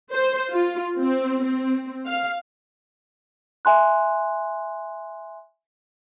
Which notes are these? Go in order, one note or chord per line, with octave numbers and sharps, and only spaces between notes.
C5
F4
C4
C4
F5
E5 G#5 C6 F#6